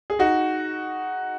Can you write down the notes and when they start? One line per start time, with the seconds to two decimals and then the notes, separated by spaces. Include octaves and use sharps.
0.10 G#4
0.19 D#4 F#4